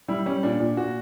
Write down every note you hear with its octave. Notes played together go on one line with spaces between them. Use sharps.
G3 E4
G3 C#4
A#2 D4
A#2
A#2 F#4